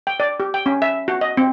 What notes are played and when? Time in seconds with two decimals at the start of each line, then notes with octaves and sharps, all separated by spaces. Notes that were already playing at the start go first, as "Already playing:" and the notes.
0.07 G5
0.20 D5
0.40 G4
0.54 G5
0.66 C#4
0.82 E5
1.08 F#4
1.21 D#5
1.37 C4